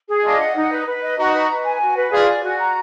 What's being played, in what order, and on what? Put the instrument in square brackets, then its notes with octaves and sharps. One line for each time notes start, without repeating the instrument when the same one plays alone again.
[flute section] G#4
[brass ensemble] D4 F4 [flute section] D#5
[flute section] F#5
D#4
B4
B4
D#5
[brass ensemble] D#4 F#4 [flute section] A#5
[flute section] B4
B4
G#5
F#4
B4
[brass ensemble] F4 G#4 [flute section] D5
[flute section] G#5
F#4
A#5